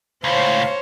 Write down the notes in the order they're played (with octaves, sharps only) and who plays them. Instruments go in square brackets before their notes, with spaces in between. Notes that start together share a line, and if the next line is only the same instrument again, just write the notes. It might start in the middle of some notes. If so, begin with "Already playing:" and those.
[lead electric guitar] C#2 A2 [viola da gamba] C5 C#5 [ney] F5